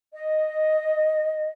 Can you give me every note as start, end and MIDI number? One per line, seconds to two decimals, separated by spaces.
0.13 1.51 75